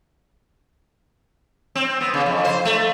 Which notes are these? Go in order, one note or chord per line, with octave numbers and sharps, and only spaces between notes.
C4
B3
C#3
F2
C5
A3